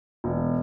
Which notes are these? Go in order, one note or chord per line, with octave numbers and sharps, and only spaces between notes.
E1